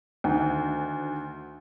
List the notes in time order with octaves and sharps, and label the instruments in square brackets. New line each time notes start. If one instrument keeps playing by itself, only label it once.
[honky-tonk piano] D2 D#3